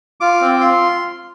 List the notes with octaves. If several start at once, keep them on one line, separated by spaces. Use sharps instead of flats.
F4 D6
C4
F4 C6